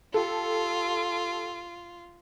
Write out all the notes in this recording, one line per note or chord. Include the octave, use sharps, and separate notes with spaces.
F4 G4 A4